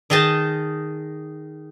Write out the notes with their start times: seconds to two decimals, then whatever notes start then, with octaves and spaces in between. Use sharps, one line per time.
0.10 D#3 D#4 G#4 D#5 A5